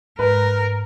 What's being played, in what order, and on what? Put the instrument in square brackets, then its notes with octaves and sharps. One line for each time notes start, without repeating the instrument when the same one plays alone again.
[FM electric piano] G#2 [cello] A#4 [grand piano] B4